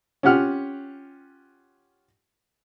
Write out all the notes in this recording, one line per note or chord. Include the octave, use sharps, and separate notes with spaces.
C#4 F4 G4 F#5 F6